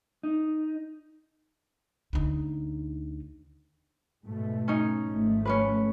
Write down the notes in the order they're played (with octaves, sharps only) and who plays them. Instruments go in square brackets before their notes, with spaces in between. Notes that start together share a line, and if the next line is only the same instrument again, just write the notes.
[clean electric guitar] D#4
[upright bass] D2 D#4
[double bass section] G#2 B2 A3
[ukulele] C#4 D#4
[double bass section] G#1 F3 A3
[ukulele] C#4 D4 B4